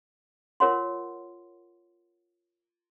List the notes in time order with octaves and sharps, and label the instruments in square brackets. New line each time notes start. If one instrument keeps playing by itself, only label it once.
[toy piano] F4 A#4 C#5 F#5 C6